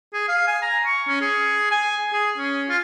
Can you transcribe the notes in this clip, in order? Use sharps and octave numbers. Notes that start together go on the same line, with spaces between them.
G#4
F5
G#5
A#5
C#6
C#4
G#4
G#5
G#4
C#4
F4